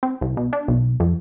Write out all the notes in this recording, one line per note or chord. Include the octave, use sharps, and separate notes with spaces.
C4
C2
B2
D4
B1
F2